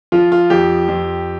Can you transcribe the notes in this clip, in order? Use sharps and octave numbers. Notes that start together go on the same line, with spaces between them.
F3 F4
F4
F2 G4
F2